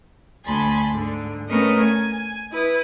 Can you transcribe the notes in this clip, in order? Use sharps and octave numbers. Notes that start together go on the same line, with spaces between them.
D2 G#5 A5 B5 C6
G#2 D3
A3 B3 C#4 A#4 B4 D#5
G#5 G#6
E4 B4 D#6